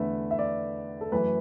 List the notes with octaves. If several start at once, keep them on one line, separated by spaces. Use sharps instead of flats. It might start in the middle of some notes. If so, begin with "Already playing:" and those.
Already playing: E2 D3 A3 B4 E5
E5
D5
A4
F#2 E3 A3 B4